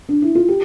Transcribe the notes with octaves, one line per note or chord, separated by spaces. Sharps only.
D4
E4
F4
G4